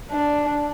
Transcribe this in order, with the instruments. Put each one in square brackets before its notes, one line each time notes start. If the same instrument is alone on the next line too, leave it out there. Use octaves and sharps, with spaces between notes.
[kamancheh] D4